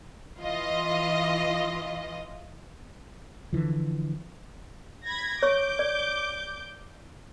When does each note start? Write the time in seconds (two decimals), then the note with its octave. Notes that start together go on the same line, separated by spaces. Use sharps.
0.39 E3 F4 D#5
3.53 D3 E3 F3
5.05 B5 G#6 A#6
5.43 C#5 C#6 D6 G6
5.79 D5